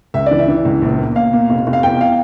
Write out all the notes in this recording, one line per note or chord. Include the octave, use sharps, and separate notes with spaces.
C#2 E5
E3 D5
E5
E3
C#2
A#1
A#2
A#2 F5
A#2
F1
F1
F5
E2 G5
F5